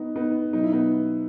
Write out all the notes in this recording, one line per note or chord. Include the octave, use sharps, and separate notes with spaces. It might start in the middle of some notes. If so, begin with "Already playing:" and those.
Already playing: B3 D#4
B3 D#4
B2 F#3 D#4
E4
B3 D#4